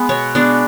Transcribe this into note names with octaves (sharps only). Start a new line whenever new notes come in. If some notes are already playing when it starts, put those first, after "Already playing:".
Already playing: G#3 B3
B2 C#5
G#3 B3 D4